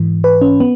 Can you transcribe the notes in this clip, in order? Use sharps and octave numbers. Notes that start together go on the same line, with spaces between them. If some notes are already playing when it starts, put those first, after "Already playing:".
Already playing: G#2 E3
B4
C#4
B3